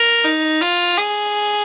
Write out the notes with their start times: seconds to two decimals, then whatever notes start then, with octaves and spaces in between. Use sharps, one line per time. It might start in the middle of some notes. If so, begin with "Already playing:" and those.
Already playing: A#4
0.24 D#4
0.61 F4
0.97 G#4